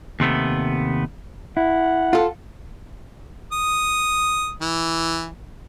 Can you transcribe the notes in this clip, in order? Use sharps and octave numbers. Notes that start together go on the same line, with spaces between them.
D#2 C3 A3 B3
E4 F#5
F4 A4
D#6
E3